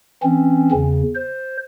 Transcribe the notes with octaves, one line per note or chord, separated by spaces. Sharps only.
E3 C4 C#4
E2 C#3
C5